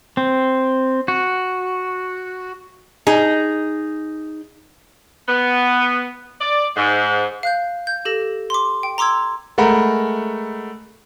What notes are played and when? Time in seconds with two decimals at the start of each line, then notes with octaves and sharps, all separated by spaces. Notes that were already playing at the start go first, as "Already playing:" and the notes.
0.17 C4
1.08 F#4
3.07 D#4 G#4
5.29 B3
6.41 D5
6.76 G#2
7.43 F5 F#6 G6
7.87 G6
8.05 G4 A4 A#6
8.50 C6 D6
8.83 G5
8.98 A#5 C6 D6 E6 G#6
9.58 G#3 A3 A#4 F#5 A#5 B5